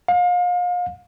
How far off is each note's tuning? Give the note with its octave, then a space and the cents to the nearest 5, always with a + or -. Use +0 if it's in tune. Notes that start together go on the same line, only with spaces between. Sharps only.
F5 +35